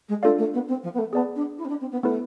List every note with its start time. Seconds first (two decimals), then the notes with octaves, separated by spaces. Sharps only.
0.09 G#3
0.23 A3 D4 F4 A4 D5 F5
0.38 A3
0.53 B3
0.68 C4
0.83 F3
0.94 B3
0.98 A3
1.13 B3 G#4 D5 A5
1.36 D4
1.58 E4
1.65 C4
1.69 D4
1.80 C4
1.92 B3
2.03 A3 B3 E4 B4